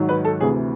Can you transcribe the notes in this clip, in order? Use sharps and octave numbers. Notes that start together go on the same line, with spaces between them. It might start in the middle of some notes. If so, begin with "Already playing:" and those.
Already playing: G#2 D#3 F#3
B4
A4
D2 C3 E3 G#4